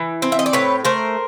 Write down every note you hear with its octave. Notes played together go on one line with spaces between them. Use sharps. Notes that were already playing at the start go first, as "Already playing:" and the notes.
Already playing: E3
C4
E5
D#5
D5
A2 B4 C#5
A3 A#4 C5